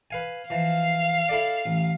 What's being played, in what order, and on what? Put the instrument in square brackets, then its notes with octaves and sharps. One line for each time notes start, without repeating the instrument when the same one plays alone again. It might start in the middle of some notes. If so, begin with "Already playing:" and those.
[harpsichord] B4 F5 G#5
[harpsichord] E3 F3 [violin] F5
[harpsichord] E4 A4 D5
A1